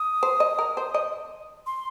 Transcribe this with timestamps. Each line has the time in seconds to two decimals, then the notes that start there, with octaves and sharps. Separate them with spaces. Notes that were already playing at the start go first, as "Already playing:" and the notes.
Already playing: D#6
0.23 C5
0.40 D#5
0.59 A#4
0.77 C5
0.94 D#5
1.66 C6